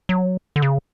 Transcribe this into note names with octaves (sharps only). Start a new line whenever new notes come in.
F#3
D3
C#3